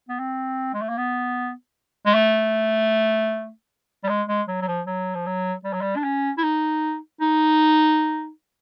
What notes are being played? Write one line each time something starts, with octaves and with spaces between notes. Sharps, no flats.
B3
C4
G#3
A3
A#3
B3
G#3
A3
G3
G#3
G#3
F#3
F#3
F3
F#3
F3
F#3
G3
F#3
G3
D4
C#4
E4
D#4
D#4